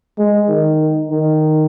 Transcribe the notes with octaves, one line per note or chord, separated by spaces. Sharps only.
G#3
D#3
D#3